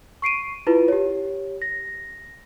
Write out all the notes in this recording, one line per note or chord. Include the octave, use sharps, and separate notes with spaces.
C#6 C7 D7 D#7
E4 F4 B4
G4 C#5
A#6